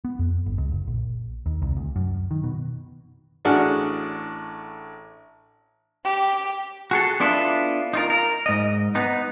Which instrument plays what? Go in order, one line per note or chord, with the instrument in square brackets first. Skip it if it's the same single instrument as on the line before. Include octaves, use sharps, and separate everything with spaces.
[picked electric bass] B3
F2
G1
C#2
F#1
A#1
D#2
C2
D2
F#2
D#3
B2
[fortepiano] A1 D4 F#4 G#4 F#5 F6
[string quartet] G4
[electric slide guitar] F#4 G#4 A4
B3 D4 E4 F4 A4
D#4 F4 A#4
A#4
G#2 D#5
B3 D#4